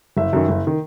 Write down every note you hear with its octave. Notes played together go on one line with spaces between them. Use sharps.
F#1 E5
F#2 D#3
F#1
D#3